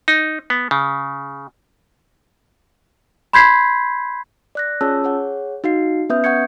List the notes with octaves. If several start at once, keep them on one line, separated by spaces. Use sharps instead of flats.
D#4
B3
C#3
B5 C6 G6 G#6 B6 C7
D5 F#6 A#6
C#4 F4 G#4 C#5 A5 E6
G#4 C#5 F#5
D#4 F#4 F5 C7
B3 C#4 B4 E5 D#6 G6
F#5 C#6 G6 G#6 C#7